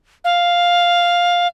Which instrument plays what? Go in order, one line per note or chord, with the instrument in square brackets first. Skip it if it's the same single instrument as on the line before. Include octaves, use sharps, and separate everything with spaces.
[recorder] F5